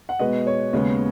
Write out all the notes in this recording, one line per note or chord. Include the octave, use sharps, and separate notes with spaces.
F#5
B2 G#3 B3 B4 D#5
C#5
D#2 C#3 G#3 B3